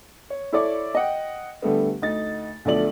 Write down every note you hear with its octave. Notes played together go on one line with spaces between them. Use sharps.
C#5
E4 A4 C#5 D5 D6
D#5 F#5 G5
D3 G3 A3 B3
D2 D#4 A6
B1 D3 F3 A3 D5 F#7